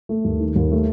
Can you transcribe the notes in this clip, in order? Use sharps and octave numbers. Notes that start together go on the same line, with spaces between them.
A3
D#2
D#3
D#2
A3